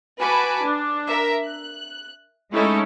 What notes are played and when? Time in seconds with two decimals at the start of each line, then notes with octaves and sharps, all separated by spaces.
0.19 F#4 B4 G#5 A5 B5 D6
0.63 D4
1.08 A#4 E5
1.43 F#6
2.53 G#3 A3 C#4 D#4 E4 A4